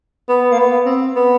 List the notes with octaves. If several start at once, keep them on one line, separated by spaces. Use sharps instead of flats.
B3
A#3
B3
C4
B3